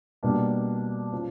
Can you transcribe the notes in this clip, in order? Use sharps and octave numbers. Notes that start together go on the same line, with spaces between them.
B2 G3 A#3 D4
C#3 F3